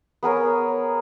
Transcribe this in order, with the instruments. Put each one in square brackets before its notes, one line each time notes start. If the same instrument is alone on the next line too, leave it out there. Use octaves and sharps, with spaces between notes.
[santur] B3 G#4 A#4 C#5